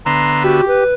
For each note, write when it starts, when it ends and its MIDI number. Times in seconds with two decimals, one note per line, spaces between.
0.06 0.61 50
0.06 0.61 59
0.06 0.61 76
0.06 0.43 82
0.06 0.43 84
0.43 0.67 66
0.43 0.84 67
0.68 0.94 71